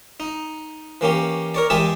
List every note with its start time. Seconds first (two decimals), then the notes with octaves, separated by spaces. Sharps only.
0.20 D#4
1.01 E3 A#3 C#4 G4
1.54 A#4 C#5 D5
1.70 E2 G#3 G4 G#4 E5 A5